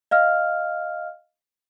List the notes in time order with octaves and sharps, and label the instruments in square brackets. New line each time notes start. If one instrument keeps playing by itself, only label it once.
[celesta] D#5 F5 F6